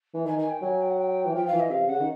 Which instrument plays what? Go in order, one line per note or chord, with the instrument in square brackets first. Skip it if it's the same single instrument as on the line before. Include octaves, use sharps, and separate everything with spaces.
[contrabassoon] E3
[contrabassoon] D#3 [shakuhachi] G#5
[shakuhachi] G#5
G5
[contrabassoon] F#3 [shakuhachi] G#5
[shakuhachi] G5
F#5
G5
[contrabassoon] E3
[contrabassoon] F3 [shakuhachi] G5
[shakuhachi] F5
[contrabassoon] E3
[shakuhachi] D#5
[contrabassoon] C3 [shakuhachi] F5
[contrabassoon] C#3 [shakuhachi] F#5
[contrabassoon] D#3